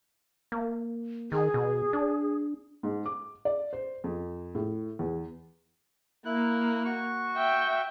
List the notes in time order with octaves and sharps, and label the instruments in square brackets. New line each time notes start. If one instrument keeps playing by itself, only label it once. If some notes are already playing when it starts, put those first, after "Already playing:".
[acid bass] A#3
[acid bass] D#3 [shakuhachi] G#4
[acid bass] B2
D4
[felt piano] G#2
D6
D5
C5
F2
A2
E2
[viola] A#3 [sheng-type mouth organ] E4 F#6
[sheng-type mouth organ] F#4 C#6
[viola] E5 G5